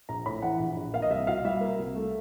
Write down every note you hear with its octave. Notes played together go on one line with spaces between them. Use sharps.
A#1 A#5
A2 B5
E3 F#5
A#1
A#1
A#3 F5
D#5
C2 E5
B2 F5
G3 E5
A#3
C2
A3